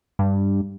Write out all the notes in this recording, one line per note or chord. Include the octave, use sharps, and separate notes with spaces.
G2